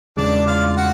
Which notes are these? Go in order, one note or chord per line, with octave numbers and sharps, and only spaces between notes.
E2 C#3 E3 G#3 D4 D5
F4 F5
F5
F#4 F#5